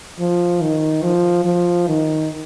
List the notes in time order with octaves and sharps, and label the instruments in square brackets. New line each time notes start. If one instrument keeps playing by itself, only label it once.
[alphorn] F3
D#3
F3
F3
D#3